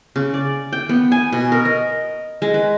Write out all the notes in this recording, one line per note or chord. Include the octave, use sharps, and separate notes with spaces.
C#3
D5
G5
B3
G#5
B2
A#4
D#5
G#3
B4